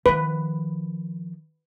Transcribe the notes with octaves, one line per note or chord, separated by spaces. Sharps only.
D#3 F3 B4